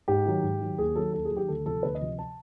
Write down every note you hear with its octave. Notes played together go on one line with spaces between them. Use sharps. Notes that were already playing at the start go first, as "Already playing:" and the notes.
G#2 G4
D#3 F#3
G#2
D#3 F#3
D#2 G#4
D#3 F#3 A4
D#2 A4
G#4
D#3 F#3
G4
D2 A4
C3 F3 A4
D2 B4
D#5
C3 F3
A5